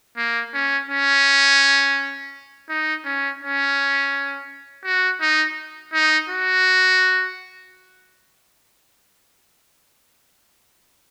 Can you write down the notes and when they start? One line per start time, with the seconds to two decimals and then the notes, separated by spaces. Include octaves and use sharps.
0.17 A#3
0.53 C#4
0.89 C#4
2.69 D#4
3.05 C#4
3.41 C#4
4.85 F#4
5.21 D#4
5.93 D#4
6.30 F#4